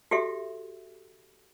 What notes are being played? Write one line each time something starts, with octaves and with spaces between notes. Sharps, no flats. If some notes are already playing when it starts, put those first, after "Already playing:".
F#4 G4 A4 E5